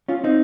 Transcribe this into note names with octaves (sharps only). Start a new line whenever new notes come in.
C#4 F4
C4 D#4